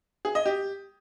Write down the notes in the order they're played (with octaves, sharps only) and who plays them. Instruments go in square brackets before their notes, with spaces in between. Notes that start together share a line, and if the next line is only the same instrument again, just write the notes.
[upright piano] G#4
D#5
G4